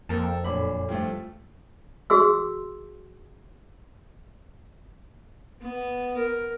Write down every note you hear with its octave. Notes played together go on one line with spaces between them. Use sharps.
F2 F3 A#3 A4 A#4 A5
G5
F#2 A#2 D4 A4 B5 D6
G2 F3 A3 G4
F#4 G#4 C6 E6
B3
A#4